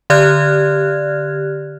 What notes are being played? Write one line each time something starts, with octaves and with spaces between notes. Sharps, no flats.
D3 G4 D5 F6 F#6 G#6